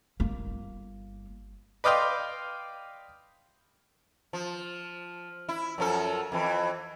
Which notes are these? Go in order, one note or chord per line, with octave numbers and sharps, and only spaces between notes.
G1 A#3
B4 D5 D#5 F5 G5 C6
F3
E4
F#2 F3 A4
F2 E3